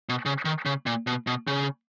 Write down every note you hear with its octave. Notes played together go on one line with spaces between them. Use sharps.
B2
C#3
D#3
C#3
A#2
B2
B2
C#3